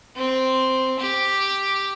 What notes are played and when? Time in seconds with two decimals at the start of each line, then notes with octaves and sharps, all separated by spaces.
0.15 C4
0.99 G4